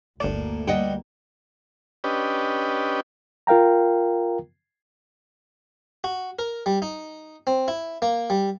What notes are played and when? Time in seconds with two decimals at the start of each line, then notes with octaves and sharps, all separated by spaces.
0.20 G1 D2 A2 A#3 D4 D5
0.67 G2 G3 D#5 F#5 G5
2.04 C#4 D4 G4 B4 D#5
3.47 F4 A#4 F5 G5 A#5
6.04 F#4
6.39 A#4
6.66 G3
6.82 D#4
7.47 C4
7.68 E4
8.02 A#3
8.30 G3